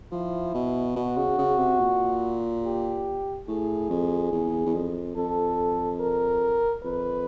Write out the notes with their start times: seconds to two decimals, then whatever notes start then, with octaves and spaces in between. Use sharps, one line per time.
0.12 F3 E4
0.54 B2
0.96 B2 F#4
1.17 C#3
1.38 C#3
1.59 C3
1.80 A#2
2.65 G4
3.48 A2 G#4
3.90 F2
4.32 E2
4.66 E2
4.74 F2
5.16 F2 A4
6.00 A#4
6.83 F2 B4